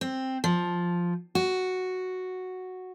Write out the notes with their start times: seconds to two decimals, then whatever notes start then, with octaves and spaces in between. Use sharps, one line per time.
0.01 C4
0.44 F3
1.35 F#4